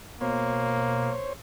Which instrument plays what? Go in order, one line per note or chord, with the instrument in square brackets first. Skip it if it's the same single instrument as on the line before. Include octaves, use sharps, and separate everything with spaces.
[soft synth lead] B2 [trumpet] A#3 [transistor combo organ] C5 C#5